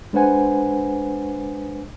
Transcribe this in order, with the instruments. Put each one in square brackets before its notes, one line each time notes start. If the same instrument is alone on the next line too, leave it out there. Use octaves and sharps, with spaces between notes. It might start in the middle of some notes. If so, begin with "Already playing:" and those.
[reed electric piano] G#3 D4 B4 C5 F#5 G#5